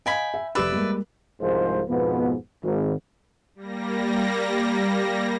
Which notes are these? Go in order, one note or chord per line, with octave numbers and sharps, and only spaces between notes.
D#5 F5 G5 G#5 B5
E5
F1 G4 B4 D5 E5 B5
G3 G#3 A#3
C2 G#2 F3 G#3 A#4 C5
F2 G#2 B2 F3 B3
G#1
G3 A#3 A#6